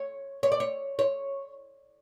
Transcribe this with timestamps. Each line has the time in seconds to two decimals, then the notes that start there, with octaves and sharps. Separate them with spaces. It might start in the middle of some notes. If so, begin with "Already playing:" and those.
Already playing: C#5
0.43 C#5
0.52 D5
0.60 C#5
0.99 C#5